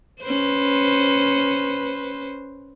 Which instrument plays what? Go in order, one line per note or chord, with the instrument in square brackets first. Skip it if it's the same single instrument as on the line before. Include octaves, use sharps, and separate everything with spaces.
[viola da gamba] C#4 B4 C5